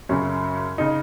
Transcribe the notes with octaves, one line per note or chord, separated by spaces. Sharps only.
F#2 C#3 C#4
C#3 D#4